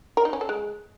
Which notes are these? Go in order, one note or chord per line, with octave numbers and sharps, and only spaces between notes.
A#4
D#4
C#4
A4
G#3